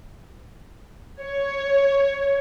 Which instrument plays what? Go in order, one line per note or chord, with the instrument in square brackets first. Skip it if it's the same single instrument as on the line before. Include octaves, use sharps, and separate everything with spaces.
[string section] C#5